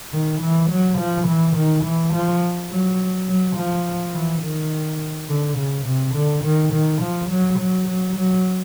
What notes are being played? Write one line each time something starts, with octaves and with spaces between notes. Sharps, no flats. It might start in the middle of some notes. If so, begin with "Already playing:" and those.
D#3
E3
F#3
F3
E3
D#3
E3
F3
F#3
F#3
F3
E3
D#3
D3
C#3
C3
D3
D#3
D#3
F3
F#3
F#3
F#3
F#3